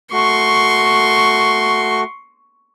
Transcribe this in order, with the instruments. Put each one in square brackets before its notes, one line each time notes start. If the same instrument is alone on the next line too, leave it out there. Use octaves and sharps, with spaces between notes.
[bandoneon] A3 F#4 [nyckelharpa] C6 C#6